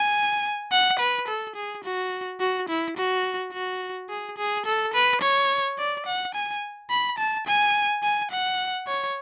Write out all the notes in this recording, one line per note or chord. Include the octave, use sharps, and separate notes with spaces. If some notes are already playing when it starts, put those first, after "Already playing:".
Already playing: G#5
F#5
B4
A4
G#4
F#4
F#4
E4
F#4
F#4
G#4
G#4
A4
B4
C#5
D5
F#5
G#5
B5
A5
G#5
G#5
F#5
C#5